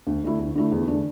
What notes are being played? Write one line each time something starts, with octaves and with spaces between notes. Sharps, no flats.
D2
D3 A3 E4
D2
D3 A3 E4
E2
D3 A3 D4